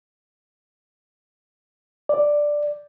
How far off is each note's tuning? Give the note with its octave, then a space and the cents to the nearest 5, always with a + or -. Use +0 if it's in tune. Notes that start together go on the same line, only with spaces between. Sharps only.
D5 +5